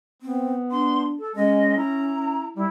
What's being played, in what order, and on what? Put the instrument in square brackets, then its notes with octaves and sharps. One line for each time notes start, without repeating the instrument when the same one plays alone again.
[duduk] B3 [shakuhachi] C4
[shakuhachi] D4 [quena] C6
[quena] A4
[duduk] G#3 [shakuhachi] C#4 [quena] D#5
[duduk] E4 [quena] A#5
[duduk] G3 [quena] E4